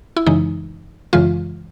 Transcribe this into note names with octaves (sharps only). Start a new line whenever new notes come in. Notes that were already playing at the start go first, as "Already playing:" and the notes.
E4
F#2 C#3 E3 G#3 D#4
F#2 C#3 E3 G#3 F4